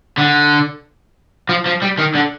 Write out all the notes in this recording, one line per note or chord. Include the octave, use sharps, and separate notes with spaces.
D3
F3
F3
G3
D#3
D3